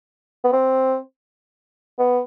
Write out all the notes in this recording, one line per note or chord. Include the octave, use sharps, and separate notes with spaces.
B3
C4
B3